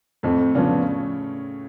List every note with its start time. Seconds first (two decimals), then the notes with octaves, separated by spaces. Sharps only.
0.23 F2 A2 A3
0.55 C#3 F3 B3 C#4 D4